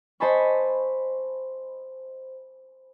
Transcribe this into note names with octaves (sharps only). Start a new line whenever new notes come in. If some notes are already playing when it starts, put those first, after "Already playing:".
C5 D#5 G#5 A5 B5 C#6